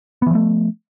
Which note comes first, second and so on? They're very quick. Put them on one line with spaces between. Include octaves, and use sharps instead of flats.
B3 E3 F3 A3